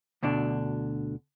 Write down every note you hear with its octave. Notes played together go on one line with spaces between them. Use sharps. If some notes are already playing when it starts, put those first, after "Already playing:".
D2 B2 D3 D4